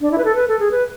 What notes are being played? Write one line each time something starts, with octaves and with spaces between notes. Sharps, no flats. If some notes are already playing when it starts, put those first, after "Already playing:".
D4
E4
B4
A4
B4
A4
G#4
B4